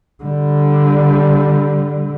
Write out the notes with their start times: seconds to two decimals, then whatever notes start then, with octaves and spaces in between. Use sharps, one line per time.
0.23 D3 G3